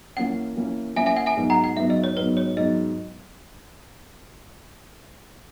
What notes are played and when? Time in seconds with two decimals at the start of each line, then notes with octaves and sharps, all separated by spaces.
0.17 E3 A#3 C#4 F#5
0.57 E3 A#3 C#4
0.96 E3 A#3 C#4 E5 G#5
1.06 E5 G#5
1.17 F#5
1.26 E5 G#5
1.36 G#2 F#3 B3
1.50 F#5 A#5
1.64 F#5
1.76 G#2 F#3 B3 E5
1.90 D#5
2.04 C#5
2.17 G#2 F#3 B3 B4
2.37 C#5
2.57 G#2 F#3 B3 D#5